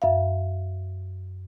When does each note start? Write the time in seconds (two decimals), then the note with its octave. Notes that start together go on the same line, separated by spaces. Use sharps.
0.02 F#2 E5 F5